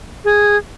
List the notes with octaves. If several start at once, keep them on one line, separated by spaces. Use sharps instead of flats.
G#4